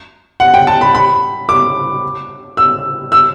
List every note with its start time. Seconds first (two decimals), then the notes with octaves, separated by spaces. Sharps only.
0.40 F#5
0.54 G5
0.67 A5
0.81 B5
0.95 B5
1.49 D6
2.57 E6
3.12 E6